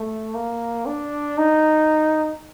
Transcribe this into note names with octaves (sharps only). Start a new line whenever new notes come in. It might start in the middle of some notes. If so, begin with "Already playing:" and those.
Already playing: A3
A#3
D4
D#4